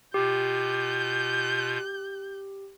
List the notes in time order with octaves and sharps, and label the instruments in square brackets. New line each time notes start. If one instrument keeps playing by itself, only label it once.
[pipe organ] B2 F4 [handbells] G4 [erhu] G6